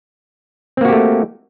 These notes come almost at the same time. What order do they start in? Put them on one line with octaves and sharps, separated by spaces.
C4 A#3 F#4 G4 A3